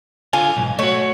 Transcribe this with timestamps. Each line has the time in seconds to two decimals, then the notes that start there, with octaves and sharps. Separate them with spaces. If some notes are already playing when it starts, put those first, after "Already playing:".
0.33 D3 F4 F5 G#5
0.57 B1 G#2
0.79 A3 F#4 C#5